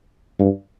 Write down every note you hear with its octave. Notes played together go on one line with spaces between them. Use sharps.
G2